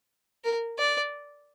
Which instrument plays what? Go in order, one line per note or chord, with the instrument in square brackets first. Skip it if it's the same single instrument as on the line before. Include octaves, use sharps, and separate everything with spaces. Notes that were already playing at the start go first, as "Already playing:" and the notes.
[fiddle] A#4
D5